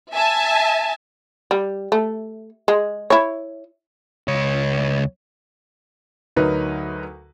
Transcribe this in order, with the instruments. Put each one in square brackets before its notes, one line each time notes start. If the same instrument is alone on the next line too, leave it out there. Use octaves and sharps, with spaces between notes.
[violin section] E5 G#5 A5
[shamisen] G3
A3
G#3
E4 C#5
[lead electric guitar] C#2 C#5
[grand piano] D2 F#3 D#4 A#4 B4